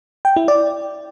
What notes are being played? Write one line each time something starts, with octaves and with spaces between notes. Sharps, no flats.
G5
E4
D5